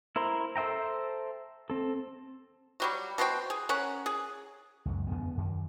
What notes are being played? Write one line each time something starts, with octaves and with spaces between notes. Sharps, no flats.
E4 A#4 C5 A#5 C6
A4 C5 E5 G5 A#5
C4 A4
F#3 G3 F#4
B2 F#4 C5 G5
G#4
C#4 A#4 F#5
G#4
C#2 F#2
E2 D3 B3
F#2 D#3